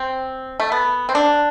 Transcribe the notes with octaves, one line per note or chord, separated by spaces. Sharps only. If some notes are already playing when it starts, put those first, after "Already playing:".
Already playing: C4
A3
B3
C4
D4